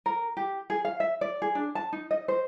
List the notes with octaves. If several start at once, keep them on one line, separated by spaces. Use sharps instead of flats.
A#4
G4
G#4
F5
E5
D5
G#4
D4
A5
D#4
D#5
C5